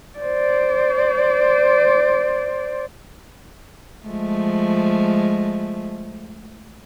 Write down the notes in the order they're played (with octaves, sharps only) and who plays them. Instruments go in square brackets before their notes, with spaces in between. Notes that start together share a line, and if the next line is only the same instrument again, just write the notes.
[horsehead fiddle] C5 D5
[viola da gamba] F3 G#3 A3